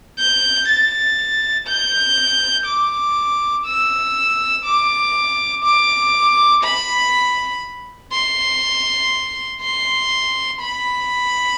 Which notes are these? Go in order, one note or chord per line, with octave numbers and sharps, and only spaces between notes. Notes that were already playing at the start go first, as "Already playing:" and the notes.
G6
A6
G6
D6
E6
D6
D6
B5
C6
C6
B5